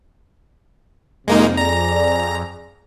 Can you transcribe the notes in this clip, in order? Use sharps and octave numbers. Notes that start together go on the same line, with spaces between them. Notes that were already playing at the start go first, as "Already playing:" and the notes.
F2 C3 G#3 A#3 D#4
G#4 D5 A#5